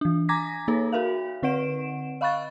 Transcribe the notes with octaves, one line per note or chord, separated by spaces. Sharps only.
E3 D4
G#5 A#5 D6 G#6 A#6 B6
A#3 D#4 G#4 A4 C#5
F#4 A#4 E5 F5
D3 C4 B4 F#5 D7 E7
D#5 F5 B5 C#6 F#6 A6